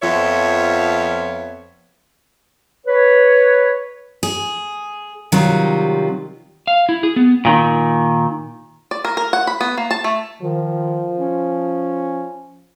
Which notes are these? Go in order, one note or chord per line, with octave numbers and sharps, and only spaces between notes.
F2 F3 B3 F4 C#5 E5
B4 C#5
G#4
C3 D#3 F#3 G3 F4
F5
E4
G#4
B3
A#2 D#3
D5
A#4
A#4
F#5
B5
B3
A#3
A5
A3
D#3 F3
C#4